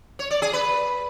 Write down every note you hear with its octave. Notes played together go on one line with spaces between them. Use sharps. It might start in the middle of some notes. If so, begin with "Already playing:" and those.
C#5
D5
G#4
B4